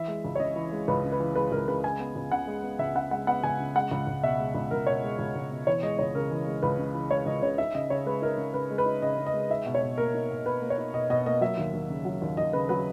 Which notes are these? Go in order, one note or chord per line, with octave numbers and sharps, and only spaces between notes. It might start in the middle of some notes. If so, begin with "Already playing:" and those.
Already playing: E3 E5
G#3
C#2
C#5
C#3 D#5
E3
G#3
C#2 B4
C#3
B4
E3
G#3 B4
C#2 A#4
C#3 B4
G#3 G#5
B3
C#2
C#3 F#5
G#3
B3
C#2 E5
C#3 F#5
G#3 F#5
B3 F#5
C#2 G#5
C#3
G#3 F#5
C#2
C#2
B2 E5
G#3
C#2
C#2 A#4
B2 C#5
G#3
C#2
C#2
B2
E3 C#5
G#3 D#5
C#2 C#5
C#3 A#4
E3
G#3
C#2 B4
C#3
E3
G#3 C#5
C#2 D#5
C#3 C#5
D#4 E5
C#3 D#5
C#3 C#5
G#3 B4
D#4 A#4
C#3
C#3 B4
G#3
B4
D#4
C#3 D#5
C#3
D#5
G#3
D#4 E5
B2
C#5
B2
A#3 A#4
D#4
B2
B2 B4
A#3
C#5
D#4
B2 D#5
B2 D#5
A#3 D#5
F#3 E5
D#2
D#2
C#3
F#3
D#2
D#2 D#5
C#3 B4
F#3 B4